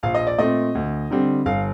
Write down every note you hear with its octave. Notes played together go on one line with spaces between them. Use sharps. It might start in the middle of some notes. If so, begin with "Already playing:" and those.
A#1 F5
D#5
D5
A#2 A3 C4 D#5
D2
D3 G3 C4
G1 F5